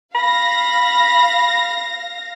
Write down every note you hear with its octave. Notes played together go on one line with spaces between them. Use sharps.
F5 B5 A#6